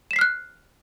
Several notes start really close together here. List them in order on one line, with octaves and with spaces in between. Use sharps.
E7 B6 C7 F6 F#6